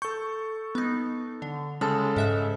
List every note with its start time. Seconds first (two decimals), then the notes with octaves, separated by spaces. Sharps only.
0.02 A4 C#6 G6
0.75 B3 D#4
1.42 D3
1.81 C#3 G#3 A4 A5
2.16 G#2 E5 F#6